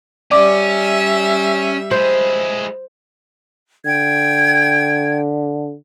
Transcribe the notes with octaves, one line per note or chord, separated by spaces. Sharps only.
G3 C#4 D5 E5 D6
G#3 E4 C5
D3 G5 G#6